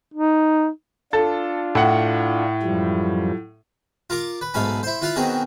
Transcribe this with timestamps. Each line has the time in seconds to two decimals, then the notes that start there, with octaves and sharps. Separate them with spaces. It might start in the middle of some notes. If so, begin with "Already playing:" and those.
0.14 D#4
1.13 D4 F4 A4
1.75 A2 F#5
2.63 F#2 F3 G3
4.10 F4 A#4 D6
4.41 B4
4.54 B1 G#2 A3 F5 G#5 B5
4.83 E4 C5
5.02 E4 F4 B4 F5
5.16 B2 D#3 C4 F#4 G#4 A#4